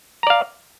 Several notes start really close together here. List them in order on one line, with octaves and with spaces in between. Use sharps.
A#5 D5 F5